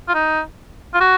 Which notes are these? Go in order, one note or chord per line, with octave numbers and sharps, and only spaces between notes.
F4
D#4
F4
F#4